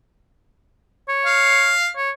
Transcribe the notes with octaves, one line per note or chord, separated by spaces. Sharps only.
C#5
F5
C#5